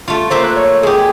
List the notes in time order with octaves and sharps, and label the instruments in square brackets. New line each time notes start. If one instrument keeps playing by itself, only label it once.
[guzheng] A3 F4
[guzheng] A3 A#3 E5 [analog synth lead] C5
[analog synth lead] F#6
C#5
[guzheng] G#3 G4 [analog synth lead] G#4